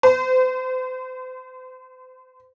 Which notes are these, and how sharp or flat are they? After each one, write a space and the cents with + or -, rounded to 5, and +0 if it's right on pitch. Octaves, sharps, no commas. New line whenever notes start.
C5 -35